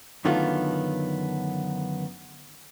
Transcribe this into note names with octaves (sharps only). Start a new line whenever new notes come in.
F#2 D3 D#3 A3 B3 F4